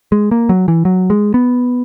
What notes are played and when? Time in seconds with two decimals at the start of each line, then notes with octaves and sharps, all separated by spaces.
0.12 G#3
0.31 A#3
0.49 F#3
0.68 E3
0.85 F#3
1.10 G#3
1.34 B3